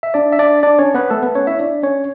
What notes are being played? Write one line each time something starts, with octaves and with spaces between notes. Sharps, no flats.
E5
D4 D5
E5
D4 D5
D4 D5
C#4 C#5
B3 B4
A3 A4
B3 B4
C#4 C#5
E4 E5
D4 D5
C#4 C#5